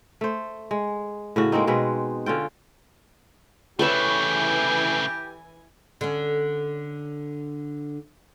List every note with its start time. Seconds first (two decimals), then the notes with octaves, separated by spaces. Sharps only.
0.21 A3 C5
0.71 G#3
1.36 A2 C#3 F#4
1.52 G#3 A#3 C4 D#4
1.67 B2 G#3 C4 B4
2.26 D3 C#4 F4 G5
3.79 C#3 E3 A3 G4 A4 B4 C#5 G#5
6.01 D3 C#4